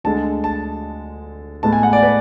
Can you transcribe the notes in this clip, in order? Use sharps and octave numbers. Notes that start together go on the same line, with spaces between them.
D2 D3 G#3 A5
A5
A2 G#3 B3 A5
G#5
F#5
D5
B4